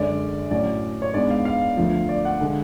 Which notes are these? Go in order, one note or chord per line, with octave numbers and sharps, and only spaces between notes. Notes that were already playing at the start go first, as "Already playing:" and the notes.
Already playing: F#2 D3 G#3 D5
A2 F#3 C#4 D5
C#5
G#2 G#3 B3 D4 D5
F5
F5
D2 D3 F3
D5
F#5
D3 G#3